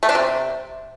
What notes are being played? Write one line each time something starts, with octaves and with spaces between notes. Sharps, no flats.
A3
D4
C3